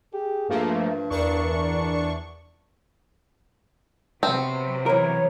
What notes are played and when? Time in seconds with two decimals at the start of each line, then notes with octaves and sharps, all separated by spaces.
0.14 G4 G#4
0.49 G2 F3 A3 A#3
1.10 E2 D4 A#4 C#6
4.23 C3 F#3 B3 C4
4.86 E3 A#4 C#5